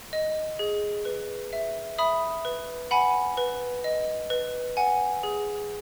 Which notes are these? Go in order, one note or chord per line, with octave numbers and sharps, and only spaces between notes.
D#5
G#4
B4
E5
E5 B5 D#6
B4
F#5 G#5 B5
B4
D#5
B4
F#5 G#5
G#4